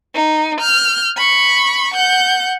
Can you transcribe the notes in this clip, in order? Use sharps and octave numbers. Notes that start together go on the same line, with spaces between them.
D#4
F6 G6
B5 C#6
F#5 G6